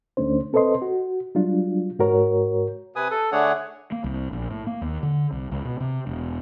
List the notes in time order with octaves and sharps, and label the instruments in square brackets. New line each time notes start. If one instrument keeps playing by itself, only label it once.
[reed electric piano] D2 A3 C#4 D4 C5
C4 A4 B4 C5 D#5 C6
F#4
F#3 G3 D4 F4
G#2 F#4 A#4 C#5
[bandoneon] C3 B4 G#5 D#6
A4
D3 A3 D4 G#4 C#5 F#5
[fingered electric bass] A#3
C2
A#1
A2
A#3
D#2
D3
C2
C#2
B2
C3
E1